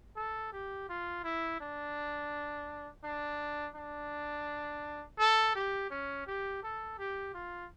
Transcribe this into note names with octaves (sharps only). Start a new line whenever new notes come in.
A4
G4
F4
E4
D4
D4
D4
A4
G4
C#4
G4
A4
G4
F4